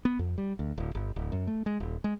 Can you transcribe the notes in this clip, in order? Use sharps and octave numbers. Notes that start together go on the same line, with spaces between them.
B3
F2
G3
D2
D1
G1
D1
F#2
A3
G#3
D#1
G#3